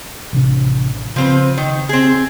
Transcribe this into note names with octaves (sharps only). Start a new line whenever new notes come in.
A1 C3 D4
C#3 F3 C4 B4
D#3
C4 G#4